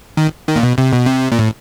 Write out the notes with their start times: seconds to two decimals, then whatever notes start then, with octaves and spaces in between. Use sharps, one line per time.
0.17 D#3
0.48 D#3
0.56 A#2
0.63 B2
0.78 C3
0.93 B2
1.06 C3
1.32 A#2
1.39 A2